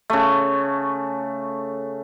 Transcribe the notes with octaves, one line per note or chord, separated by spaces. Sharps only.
C#3 A3